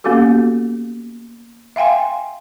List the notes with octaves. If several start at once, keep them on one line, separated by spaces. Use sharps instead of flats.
A#3 B3 C#4 F#4 G4 A4
E5 F5 G5 G#5 C6